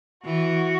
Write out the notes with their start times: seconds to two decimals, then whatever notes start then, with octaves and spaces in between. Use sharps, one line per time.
0.24 E3 F#4